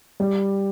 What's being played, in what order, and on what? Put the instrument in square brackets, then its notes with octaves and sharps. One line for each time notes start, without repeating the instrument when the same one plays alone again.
[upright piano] G3